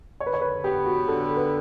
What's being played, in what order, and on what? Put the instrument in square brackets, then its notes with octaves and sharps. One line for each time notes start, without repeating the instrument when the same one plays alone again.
[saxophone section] D3 [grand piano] C#5
[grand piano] B4
C#5
B4
[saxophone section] B3 [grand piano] G4
[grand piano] F#4
[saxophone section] D3 [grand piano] A4
[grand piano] B4